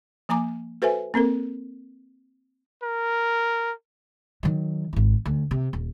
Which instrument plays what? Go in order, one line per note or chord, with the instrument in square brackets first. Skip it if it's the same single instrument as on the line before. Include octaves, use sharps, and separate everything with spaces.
[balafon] F3 A#3 G#5 A#5 D6
F#4 A4 B4 C5 E5 G#5
A#3 C4 A4 A#4
[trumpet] A#4
[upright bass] D#3 F#3
G#1 E4
D2
C3
D#1